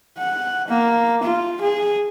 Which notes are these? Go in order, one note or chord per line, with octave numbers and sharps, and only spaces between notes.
F#5
A#3
F4
G#4